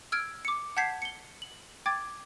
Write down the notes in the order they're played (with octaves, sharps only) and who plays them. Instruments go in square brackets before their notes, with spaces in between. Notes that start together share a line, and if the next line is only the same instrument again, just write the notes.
[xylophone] E6 F6 G#6 D7
D6 C#7
F#5 A5 G6 G#6 B6 C7
C#7 G7
F#7
G5 D6 G#6 A6